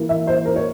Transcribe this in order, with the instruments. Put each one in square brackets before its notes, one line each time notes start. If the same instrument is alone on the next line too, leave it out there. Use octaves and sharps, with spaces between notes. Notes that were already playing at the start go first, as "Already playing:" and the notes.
Already playing: [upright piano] E3 A#3
E5
C5
A#4
C#5